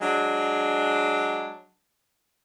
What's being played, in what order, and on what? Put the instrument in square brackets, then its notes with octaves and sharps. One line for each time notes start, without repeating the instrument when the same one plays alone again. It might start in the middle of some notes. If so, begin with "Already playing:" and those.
[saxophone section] F#3 G#3 D4